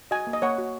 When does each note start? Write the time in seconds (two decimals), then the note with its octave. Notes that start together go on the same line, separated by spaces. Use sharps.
0.11 F#4 D#5 G#5
0.27 A#3
0.33 D#5
0.42 A#3 C#5 F#5
0.58 F#4